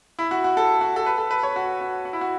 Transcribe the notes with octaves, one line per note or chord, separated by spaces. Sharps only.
E4
F#4
F#4
A4
F#4
A4
B4
A4
B4
C#5
F#4
F#4
F#4
E4
F#4